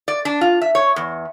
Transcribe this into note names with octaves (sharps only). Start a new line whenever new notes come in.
D5
D4
F4
E5
C#5
E2